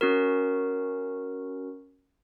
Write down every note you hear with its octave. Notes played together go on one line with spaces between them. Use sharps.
C#4 F#4 A#4